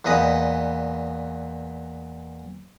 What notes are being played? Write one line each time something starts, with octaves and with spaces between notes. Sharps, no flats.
E2 A#2 B4 D#5 A#5